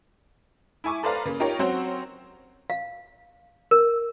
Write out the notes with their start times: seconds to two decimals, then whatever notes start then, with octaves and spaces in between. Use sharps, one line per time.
0.84 E4 E5 G#5 C#6 D6
1.03 A4 B4 C5 D5 F5 A#5
1.25 C#3 A#3
1.40 D#4 F4 G4 A#4 C#5
1.59 F#3 C4 C#4 F#4 C5 C#5
2.70 F5
3.71 A#4